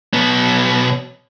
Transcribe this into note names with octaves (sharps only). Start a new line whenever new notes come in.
B1 B3